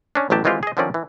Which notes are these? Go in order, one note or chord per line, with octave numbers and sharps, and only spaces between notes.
C#4 D4
A1 E2 F#3 G4 A5
D#3 E3 G#3 C4 F4 G4
G#4 D#5
D3 D#3 F3 C4 C#4 D5
E3